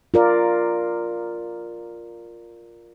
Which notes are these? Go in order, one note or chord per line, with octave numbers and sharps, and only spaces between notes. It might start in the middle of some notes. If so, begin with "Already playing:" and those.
F4 A#4 D5